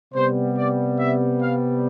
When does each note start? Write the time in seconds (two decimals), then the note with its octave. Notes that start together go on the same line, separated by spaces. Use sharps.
0.14 C3 G3 B3 C5
0.56 D5
0.99 E5
1.41 F5